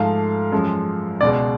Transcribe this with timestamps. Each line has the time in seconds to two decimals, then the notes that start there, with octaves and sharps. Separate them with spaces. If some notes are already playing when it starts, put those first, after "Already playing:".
Already playing: G#2 F3 A3 F5
0.52 F#2 F3 G#3
1.21 C#2 B2 G#3 D5